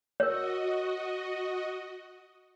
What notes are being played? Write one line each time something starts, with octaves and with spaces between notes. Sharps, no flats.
F#4 A#4 C#5 D#5